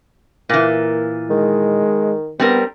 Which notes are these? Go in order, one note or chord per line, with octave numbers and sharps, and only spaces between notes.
A#2 E3 A#3
D#3 G#3
G3 B3 C4 A#4